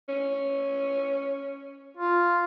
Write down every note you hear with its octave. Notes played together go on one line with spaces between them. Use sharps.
C#4
F4